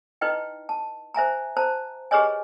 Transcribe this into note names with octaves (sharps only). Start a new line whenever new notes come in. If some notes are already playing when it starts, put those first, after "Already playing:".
D#4 E4 B4 D#5 G5
A5
C5 E5 G#5 A#5
C5 A5 A#5
G4 G#4 B4 C#5 D#5 G#5